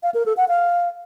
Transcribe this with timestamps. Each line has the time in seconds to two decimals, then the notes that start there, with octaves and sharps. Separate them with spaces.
0.03 F5
0.14 A#4
0.26 A4
0.37 F#5
0.48 F5